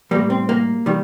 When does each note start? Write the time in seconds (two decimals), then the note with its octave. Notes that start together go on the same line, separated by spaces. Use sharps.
0.11 A2 G3 A#3
0.30 C4
0.49 A#3
0.86 D#3 G3